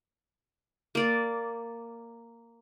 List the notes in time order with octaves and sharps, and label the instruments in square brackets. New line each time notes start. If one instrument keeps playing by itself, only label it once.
[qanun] A#3 D5